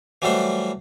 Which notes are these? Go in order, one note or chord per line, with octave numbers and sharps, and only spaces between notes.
E3 F#3 G3 A3 C5